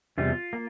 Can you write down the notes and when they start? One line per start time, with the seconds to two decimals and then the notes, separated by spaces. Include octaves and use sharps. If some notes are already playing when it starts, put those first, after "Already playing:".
0.18 E2 C3 G3 F4
0.53 A#3